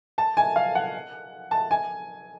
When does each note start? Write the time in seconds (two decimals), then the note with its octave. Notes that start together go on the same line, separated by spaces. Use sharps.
0.18 A5
0.37 G#5
0.56 F5
0.75 F#5
1.51 A5
1.71 G#5